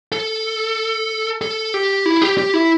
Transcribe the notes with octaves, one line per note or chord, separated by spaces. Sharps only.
A4
A4
G4
E4
G4
G4
E4